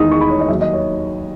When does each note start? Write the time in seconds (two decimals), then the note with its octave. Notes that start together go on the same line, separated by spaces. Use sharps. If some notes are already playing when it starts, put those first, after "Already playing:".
Already playing: E2 D#3 G#3 D#4 D#6
0.11 C#6
0.21 B5
0.30 C#5
0.40 D#5
0.48 D#2 D#3 F#3 E5
0.61 D#5
0.73 C#5